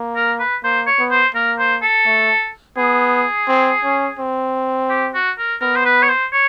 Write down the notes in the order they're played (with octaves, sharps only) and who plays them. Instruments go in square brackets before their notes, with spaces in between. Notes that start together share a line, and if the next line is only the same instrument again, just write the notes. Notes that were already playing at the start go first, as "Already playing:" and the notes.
Already playing: [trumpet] A#3
[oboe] A#4
B4
[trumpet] A#3 [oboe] C5
[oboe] C#5
[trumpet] B3
[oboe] C5
[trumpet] A#3 [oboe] A#4
[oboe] C5
A4
[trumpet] A3
[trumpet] B3 [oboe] G#4
[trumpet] C4
C#4
C4
[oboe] G4
F#4
A#4
[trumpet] B3 [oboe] A#4
[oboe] C5
B4
C#5
C5
C#5